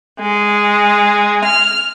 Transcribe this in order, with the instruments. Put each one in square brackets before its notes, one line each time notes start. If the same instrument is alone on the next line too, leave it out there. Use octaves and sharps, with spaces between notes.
[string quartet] G#3
F6